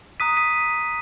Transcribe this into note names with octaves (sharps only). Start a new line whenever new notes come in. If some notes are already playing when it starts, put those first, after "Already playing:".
A#5 D#6 F#6 B6 D#7
B6 D#7